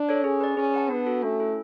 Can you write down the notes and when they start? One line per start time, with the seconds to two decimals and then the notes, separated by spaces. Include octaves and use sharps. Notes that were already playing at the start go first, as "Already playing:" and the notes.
Already playing: D4
0.09 A4 C#5
0.24 C#4 G#4
0.41 B4 D5
0.57 C#4 G#4
0.74 B4 F#5 A5
0.90 B3 D4
1.06 F#4 A4
1.23 A3 C#4
1.40 E4 A4